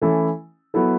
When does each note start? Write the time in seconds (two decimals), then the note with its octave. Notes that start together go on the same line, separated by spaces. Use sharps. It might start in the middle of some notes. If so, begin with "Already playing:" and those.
0.01 E3 A3 C#4 E4 A4
0.74 F#3 B3 E4 A4